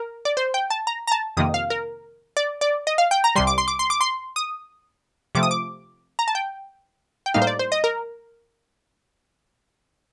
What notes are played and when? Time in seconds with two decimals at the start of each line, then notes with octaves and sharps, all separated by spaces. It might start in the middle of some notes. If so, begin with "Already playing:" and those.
Already playing: A#4
0.25 D5
0.37 C5
0.54 G5
0.70 A5
0.87 A#5
1.07 A#5
1.12 A5
1.37 F2 C3 D#3 A#3 D#6
1.54 F5
1.70 A#4
2.37 D5
2.61 D5
2.87 D#5
2.98 F5
3.11 G5
3.24 A#5
3.35 C2 C3 G3 C6
3.47 D6
3.58 C6
3.68 D6
3.79 C6
3.90 D6
4.01 C6
4.36 D#6
5.35 C3 F3 A3 D6
5.43 D#6
5.51 D6
6.19 A#5
6.28 A5
6.35 G5
7.26 G5
7.34 A2 G3 A#3 D#4 F5
7.42 C5
7.47 D5
7.59 C5
7.72 D#5
7.84 A#4